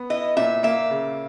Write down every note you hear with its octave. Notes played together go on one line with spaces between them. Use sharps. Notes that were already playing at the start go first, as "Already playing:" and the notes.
Already playing: B3
E4 D#5
A#2 E5
A#3 E5
C#3